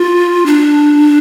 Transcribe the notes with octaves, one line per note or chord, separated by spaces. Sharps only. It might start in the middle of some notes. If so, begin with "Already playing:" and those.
Already playing: F4
D4